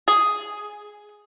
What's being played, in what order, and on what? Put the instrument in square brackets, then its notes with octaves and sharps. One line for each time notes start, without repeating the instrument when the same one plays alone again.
[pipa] G#4